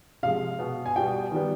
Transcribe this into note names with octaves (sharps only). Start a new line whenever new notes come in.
C3 F3 G#3 F5
B2 B3
G#5
B2 G3 B3 G5
D#3 G3 B3